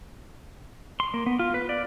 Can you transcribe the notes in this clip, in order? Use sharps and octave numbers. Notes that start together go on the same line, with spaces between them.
C6
A#3
B3
F4
B4
D5